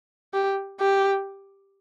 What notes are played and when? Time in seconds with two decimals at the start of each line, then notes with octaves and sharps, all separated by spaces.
0.34 G4
0.80 G4